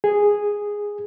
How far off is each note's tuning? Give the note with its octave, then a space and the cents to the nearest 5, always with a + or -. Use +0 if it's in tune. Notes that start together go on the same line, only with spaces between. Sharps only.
G#4 -5